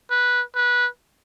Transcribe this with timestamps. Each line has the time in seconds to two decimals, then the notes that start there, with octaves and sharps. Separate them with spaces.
0.11 B4
0.55 B4